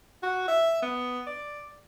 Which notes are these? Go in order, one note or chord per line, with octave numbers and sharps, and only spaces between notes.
F#4
E5
B3
D5